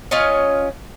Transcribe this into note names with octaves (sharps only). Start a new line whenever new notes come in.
C#4 F4 C#5 D#5